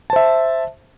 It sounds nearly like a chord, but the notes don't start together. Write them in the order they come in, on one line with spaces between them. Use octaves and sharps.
A5 C5 E5